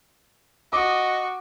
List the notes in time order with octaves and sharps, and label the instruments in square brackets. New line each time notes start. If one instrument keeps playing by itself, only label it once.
[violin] F#4 [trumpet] D#5 [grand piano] D6